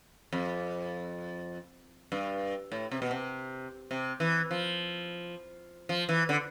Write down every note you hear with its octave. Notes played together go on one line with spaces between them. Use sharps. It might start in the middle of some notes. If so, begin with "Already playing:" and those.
F2
G2
A2
C3
B2
C3
C3
E3
F3
F3
E3
D3